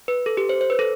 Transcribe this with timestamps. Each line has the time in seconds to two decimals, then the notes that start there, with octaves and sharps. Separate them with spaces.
0.08 B4
0.26 A4
0.37 G4
0.49 C5
0.61 C5
0.70 B4
0.79 A4